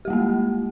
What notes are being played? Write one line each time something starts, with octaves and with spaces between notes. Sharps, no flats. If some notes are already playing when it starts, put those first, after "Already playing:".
G3 G#3 A#3 G4